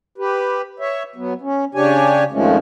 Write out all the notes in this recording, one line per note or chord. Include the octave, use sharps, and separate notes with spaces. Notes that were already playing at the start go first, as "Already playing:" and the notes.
G4 B4
C#5 E5
F#3 B3
C#4
C#3 D4 G4 C#5 G#5
F2 D#3 F3 G#3 A3 C#4